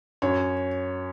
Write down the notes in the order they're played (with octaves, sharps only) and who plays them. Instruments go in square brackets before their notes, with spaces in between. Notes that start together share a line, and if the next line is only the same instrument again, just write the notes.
[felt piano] F#2 C#5